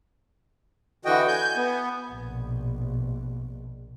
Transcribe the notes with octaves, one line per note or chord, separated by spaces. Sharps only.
D3 E3 F#4 D#5 G5
G#5 G6
B3
A#1 B2